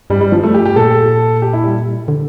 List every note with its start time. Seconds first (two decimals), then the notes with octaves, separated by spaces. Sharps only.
0.10 G2 G3
0.21 G3
0.32 F3
0.43 A3
0.54 G4
0.65 G4
0.76 A#2 A4
1.42 G4
1.53 E4
1.64 G3
2.08 D3